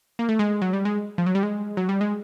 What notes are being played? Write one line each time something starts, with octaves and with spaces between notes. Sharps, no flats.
A#3
A3
G#3
F#3
G3
G#3
F3
F#3
G3
G#3
F#3
G3
G#3